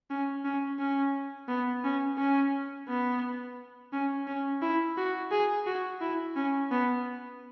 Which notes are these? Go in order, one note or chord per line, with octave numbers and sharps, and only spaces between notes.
C#4
C#4
C#4
B3
C#4
C#4
B3
C#4
C#4
E4
F#4
G#4
F#4
E4
C#4
B3